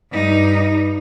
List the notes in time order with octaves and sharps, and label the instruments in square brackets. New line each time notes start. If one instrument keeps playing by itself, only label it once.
[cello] G2 D#4